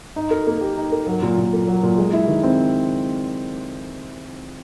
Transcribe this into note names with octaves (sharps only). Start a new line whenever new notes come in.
D#4
A#4
A#3
G4
D#4
A#4
F#3
A#2
A#2
A#3
F#3
A#2
G#3
E4
D#3
C4